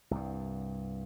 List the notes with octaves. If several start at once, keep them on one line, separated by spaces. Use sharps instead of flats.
C2 G2